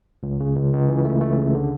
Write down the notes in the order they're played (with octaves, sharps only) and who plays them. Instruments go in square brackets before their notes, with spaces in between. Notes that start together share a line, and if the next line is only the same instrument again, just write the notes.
[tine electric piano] C#2
C#3
C#2
C#2
E3
A3
A3
C#3
D3